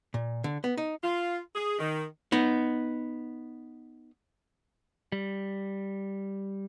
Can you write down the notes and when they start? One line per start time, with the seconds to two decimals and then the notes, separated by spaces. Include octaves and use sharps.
0.14 A#2
0.44 D3
0.64 B3
0.78 D#4
1.03 F4
1.55 G#4
1.79 D#3
2.32 B3 D#4
5.12 G3